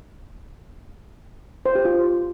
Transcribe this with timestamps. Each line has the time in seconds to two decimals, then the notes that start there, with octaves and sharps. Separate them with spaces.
1.66 C5
1.75 G4
1.85 F4